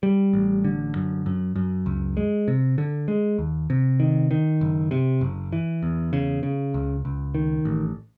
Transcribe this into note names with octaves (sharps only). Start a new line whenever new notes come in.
G3
A1
D3
F#2
F#2
F#2
C#2
G#3
C3
D3
G#3
D#2
C3
D#3
D#3
F#1
C3
F#1
E3
E2
C#3
C#3
C#2
C#2
D#3
A1